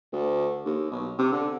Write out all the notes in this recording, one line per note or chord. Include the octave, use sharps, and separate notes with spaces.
D2
D#2
B1
C3
D3